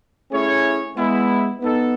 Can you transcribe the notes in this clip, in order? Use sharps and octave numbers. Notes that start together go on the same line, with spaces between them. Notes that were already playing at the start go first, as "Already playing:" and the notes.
A3 C#4 E4 G#4 C#5
G#3 B3 E4
B3 D#4 A4